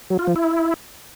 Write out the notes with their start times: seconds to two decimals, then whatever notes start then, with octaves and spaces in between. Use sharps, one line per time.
0.10 F#3
0.19 F4
0.27 F3
0.36 E4